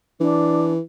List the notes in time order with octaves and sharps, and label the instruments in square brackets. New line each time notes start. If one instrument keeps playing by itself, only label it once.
[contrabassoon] E3 [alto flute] D4